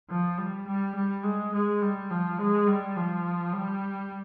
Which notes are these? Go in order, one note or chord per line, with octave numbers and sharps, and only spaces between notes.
F3
G3
G3
G3
G#3
G#3
G3
F3
G#3
G3
F3
G3